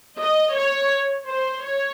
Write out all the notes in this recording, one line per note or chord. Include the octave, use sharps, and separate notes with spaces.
D#5
C#5
C5
C#5